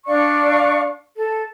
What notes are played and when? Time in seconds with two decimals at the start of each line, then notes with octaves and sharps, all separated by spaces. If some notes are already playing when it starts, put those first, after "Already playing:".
0.06 D4 D5 F5 C#6
1.15 A4